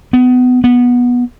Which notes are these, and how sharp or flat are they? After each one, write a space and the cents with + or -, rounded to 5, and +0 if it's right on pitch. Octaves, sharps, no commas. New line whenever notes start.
B3 +25
B3 -15